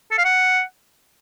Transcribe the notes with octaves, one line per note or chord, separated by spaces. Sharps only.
A4
F5
F#5